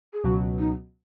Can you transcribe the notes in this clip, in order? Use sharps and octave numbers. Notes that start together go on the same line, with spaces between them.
G#4
C#2 B2 F#3 F#4
D#4